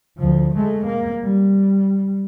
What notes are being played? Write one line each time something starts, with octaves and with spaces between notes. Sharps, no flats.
D2 F3
G#3 A3
A#3
G3